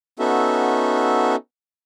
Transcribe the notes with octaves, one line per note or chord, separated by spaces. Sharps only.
B3 C#4 D#4 F#4 A4 E5